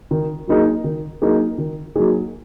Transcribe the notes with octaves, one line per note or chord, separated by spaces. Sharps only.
D#3
F#3 A#3 D#4 G#4
D#3
F#3 A#3 D#4 G#4
D#3
F#3 A#3 D#4 G#4